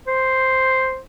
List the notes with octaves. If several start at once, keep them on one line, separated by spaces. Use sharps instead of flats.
C5